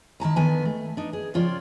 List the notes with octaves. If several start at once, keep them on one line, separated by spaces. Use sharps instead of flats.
D#3 E4 A5 A#5
D3 D#3 B3 G#5
A3
D4 D#4
G#4
C#3 F3 F4 C#5 D5 G5